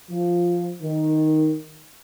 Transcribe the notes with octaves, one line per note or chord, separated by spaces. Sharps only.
F3
D#3